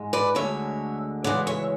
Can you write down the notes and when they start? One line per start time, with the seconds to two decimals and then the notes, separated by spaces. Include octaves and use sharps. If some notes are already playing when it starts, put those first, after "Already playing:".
Already playing: G#2 G#3
0.13 B4 D5
0.35 D2 D3 G#3 C#5 E5
1.24 D2 C#3 E3 G#3 D5 F#5
1.47 C#5 E5